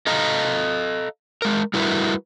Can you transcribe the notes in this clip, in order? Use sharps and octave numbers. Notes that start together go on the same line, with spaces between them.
A4 D#5 F5 A#5
G#3 A#4
G3 A3 E4 F#4 A#4 B4